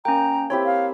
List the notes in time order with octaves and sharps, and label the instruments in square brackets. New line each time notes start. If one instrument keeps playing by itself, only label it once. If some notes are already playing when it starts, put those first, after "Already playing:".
[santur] A#3 [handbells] C#4 G5 [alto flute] A#5
[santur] C4 E4 G4 [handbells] C#5
[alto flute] F5